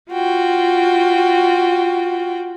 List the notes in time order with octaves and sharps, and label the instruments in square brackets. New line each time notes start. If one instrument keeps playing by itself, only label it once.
[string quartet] F4 F#4 G5